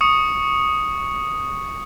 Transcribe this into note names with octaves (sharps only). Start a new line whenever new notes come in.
C#6 D#6 C#7